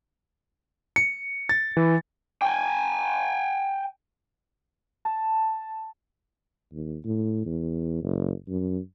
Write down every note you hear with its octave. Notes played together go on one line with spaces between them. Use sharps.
C#7
A6
E3
G5 G#5
A5
D#2
A2
E2
F#1
F#2